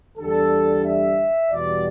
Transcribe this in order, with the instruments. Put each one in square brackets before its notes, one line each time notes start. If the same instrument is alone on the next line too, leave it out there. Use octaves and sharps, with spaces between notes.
[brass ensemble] E2 D3 G3 A4
E5
E2 B2 G3 D5